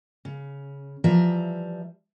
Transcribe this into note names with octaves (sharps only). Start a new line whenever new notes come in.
C#3
E3 F3 G3 D5 E5 A#5